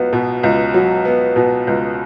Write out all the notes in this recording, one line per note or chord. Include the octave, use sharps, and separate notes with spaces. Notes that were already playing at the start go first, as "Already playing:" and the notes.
Already playing: C#2 F#3 B3
B2
C#2
F#3
B3
B2
C#2